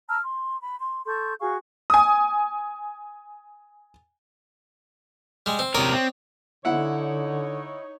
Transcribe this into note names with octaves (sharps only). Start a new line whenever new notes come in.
A5 A#5 E6 F6
C6
B5
C6
A4 C6 C#6 G6
F#4 G#4 F5 C#6
G#5 D#6
G3 G#3
C4
C3 A#4 C#5 D5 D#6
C4
D3 D#4 E4 C#5 F#5